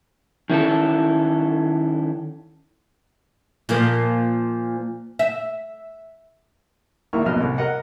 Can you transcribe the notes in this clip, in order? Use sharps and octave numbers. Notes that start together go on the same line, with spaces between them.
D#3 C#4 E4 A4
A#2 F3 A#3
E5
A#1 A#2 D#3 E4 A#4 C#6
F2 B2 D#5 F6
C2
A#4 D#5 F#5